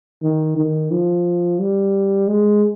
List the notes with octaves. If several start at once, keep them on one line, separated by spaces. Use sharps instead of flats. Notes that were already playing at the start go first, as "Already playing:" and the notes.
D#3
D#3
F3
G3
G#3